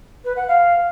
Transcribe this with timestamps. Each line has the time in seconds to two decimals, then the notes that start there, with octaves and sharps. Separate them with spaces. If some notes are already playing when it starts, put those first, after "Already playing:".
0.24 B4
0.36 F#5
0.48 F5